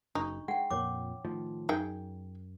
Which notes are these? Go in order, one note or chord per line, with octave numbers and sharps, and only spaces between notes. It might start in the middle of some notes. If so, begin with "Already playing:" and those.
F#1 D4 D#4 C#6
G#3 F#5 G5
F2 A#2 C#5 D6
A2 D#3 F3
F#2 D#4 G#4 G5